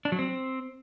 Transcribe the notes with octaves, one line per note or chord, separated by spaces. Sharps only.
D4
F#3
C4